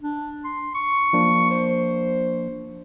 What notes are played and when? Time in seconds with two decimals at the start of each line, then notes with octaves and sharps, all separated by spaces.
0.02 D4
0.44 C6
0.75 C#6
1.13 F3 A#3 D4
1.51 C5